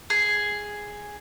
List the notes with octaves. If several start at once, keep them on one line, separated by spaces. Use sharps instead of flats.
G#4